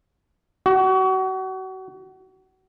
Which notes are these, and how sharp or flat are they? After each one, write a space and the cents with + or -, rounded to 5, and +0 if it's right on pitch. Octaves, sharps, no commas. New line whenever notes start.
F#4 +30